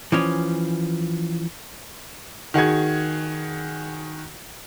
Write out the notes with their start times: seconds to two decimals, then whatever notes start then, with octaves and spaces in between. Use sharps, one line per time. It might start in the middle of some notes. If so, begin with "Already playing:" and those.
0.12 E3 F3 C#4
2.54 D#3 F#4 G#4 G#6